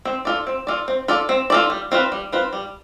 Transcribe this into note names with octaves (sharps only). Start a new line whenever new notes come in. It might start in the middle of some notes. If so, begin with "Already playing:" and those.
C4
F4 A4 D5
C4
F4 A4 D5
C4
F4 A4 D5
C4
F4 A4 D5
G3
C4 F4 B4
G3
C4 F4 B4
G3